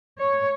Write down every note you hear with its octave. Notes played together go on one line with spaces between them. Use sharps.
C#5